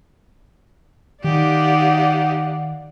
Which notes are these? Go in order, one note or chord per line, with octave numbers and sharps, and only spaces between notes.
D#3 D#4 G4 D5 F5 F#5